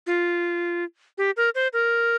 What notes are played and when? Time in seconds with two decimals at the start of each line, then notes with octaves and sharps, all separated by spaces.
0.07 F4
1.18 G4
1.37 A#4
1.55 C5
1.73 A#4